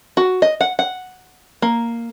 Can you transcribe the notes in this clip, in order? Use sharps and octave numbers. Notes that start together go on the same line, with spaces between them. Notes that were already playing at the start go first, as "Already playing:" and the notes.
F#4
D#5
F#5
F#5
A#3